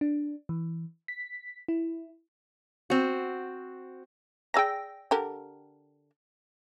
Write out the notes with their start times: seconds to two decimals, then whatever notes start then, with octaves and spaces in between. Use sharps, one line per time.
0.01 D4
0.49 E3
1.08 B6
1.68 E4
2.90 C4 F#4
4.54 G#4 D5 G5 A#5 E6 A#6
5.11 D3 G4 A#4